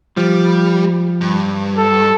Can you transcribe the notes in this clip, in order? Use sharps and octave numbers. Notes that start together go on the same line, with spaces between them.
F3 G3
G2
A4